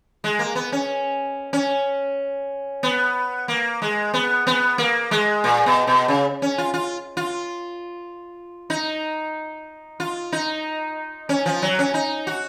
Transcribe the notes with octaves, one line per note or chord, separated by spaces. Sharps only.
G#3
A#3
B3
C#4
C#4
B3
A#3
G#3
B3
B3
A#3
G#3
A#2
B2
B2
C#3
C#4
F4
F4
F4
D#4
F4
D#4
C#4
F3
F#3
C#4
D#4
F#4